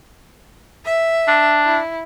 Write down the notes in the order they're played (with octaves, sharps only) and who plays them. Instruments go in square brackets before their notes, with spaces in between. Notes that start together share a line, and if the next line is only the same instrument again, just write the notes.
[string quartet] E5
[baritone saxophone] D4
[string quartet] E4